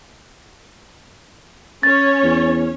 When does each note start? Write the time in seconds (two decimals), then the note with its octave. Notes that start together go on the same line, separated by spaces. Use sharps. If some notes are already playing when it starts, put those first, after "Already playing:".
1.83 C#4 C#5 A6
2.24 E2